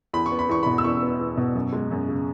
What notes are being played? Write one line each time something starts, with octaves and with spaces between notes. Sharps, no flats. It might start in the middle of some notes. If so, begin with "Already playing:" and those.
E2 B5
C#6
B3
B5
E2 C#6
B2 B5
E6
E2 C#6
B3
E2
B2
F#2
G#3
F#2
C#3